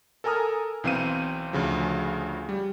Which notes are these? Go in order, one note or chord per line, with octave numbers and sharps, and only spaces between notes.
A4 A#4 G#5 A#5 D#6 F6
B1 E3 C4 C5 F5 D#7
D2 C#3 F3
G3